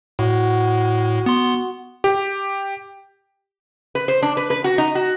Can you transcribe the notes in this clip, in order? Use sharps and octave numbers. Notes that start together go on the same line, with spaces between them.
A2 F#4
B3 C6
G4
B4
C5
D4
B4
B4
F#4
D#4
F#4